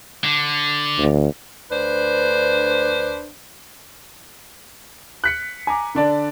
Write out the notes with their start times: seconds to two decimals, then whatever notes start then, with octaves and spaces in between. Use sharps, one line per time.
0.24 D3
0.98 D2
1.71 D2 D4 B4 C5
5.24 F#6 B6 C#7
5.67 G#5 A#5 D6
5.95 D3 D4 D5